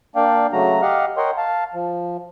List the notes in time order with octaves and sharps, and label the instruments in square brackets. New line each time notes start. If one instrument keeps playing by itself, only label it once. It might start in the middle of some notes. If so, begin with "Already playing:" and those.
[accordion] A#3 D4 D5 F5 G5
C#3 F#3 A3 F#4 A#5
G4 D#5 F5 F#5 F6
A#4 C#5 D#5 F#5 G5 C6
F5 A5
F3